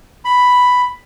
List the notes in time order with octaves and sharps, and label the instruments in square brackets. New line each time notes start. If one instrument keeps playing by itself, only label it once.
[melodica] B5